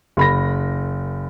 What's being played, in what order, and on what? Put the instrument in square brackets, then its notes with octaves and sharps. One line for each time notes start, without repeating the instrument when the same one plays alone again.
[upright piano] F#1 B5 A#6